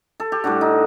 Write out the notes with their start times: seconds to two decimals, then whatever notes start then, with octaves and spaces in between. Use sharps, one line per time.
0.20 A4
0.32 G4
0.44 A2 G3 D4 F#4
0.61 D#4